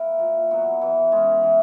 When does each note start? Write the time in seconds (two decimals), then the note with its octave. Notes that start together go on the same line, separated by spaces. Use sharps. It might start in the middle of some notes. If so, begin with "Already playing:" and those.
Already playing: A#3 E4 A#4
0.19 A#2
0.51 F#3 B3 F#4
0.82 E3
1.12 G#3 C#4
1.43 E3